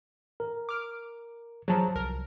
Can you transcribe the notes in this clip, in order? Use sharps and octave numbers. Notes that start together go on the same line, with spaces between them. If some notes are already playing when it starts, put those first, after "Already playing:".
A#4
D6 F6 D7
F3 F#3 G#4 A5 A#5
C2 A#4